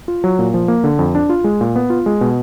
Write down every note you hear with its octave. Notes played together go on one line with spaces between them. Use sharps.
F4
F#3
A#2
F3
A#3
D3
F2
D4
F4
G#3
A#2
B3
F4
G#3
B2